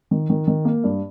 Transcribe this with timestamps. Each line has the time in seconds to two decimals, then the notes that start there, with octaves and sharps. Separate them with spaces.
0.11 D#3
0.30 D#3
0.47 D#3
0.65 A#3
0.84 G2